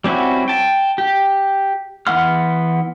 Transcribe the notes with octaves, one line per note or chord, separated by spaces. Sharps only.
G3 C4 C#4 E4 F#4
G5 A5
G4
E3 B3 F#5 C6 F6